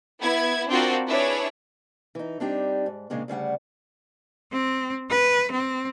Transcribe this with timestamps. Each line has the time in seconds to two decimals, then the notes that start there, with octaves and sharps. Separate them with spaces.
0.21 B3 E4 G#6
0.69 C4 D4 F4 F#4 A#4 D5
1.07 D4 E4 G#4 B4 C#5
2.15 E3 D#4
2.40 G3 C4 D4 D#4 G4
2.86 G#2
3.10 A#2 C#3 G#3 C4 D4
3.28 D2 C#3 G3 F#5
4.53 C4
5.10 B4
5.51 C4